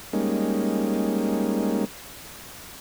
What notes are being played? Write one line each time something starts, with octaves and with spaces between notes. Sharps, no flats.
G3 G#3 A#3 C#4 D#4